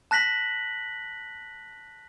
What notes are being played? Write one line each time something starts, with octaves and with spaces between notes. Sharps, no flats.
A5 F#6 A#6 B6 F#7